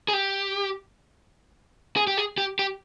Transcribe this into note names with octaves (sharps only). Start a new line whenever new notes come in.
G#4
G4
G#4
G4
G#4
G4
G4